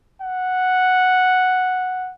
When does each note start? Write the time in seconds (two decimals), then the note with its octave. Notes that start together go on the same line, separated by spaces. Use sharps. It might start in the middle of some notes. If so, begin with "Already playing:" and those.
0.21 F#5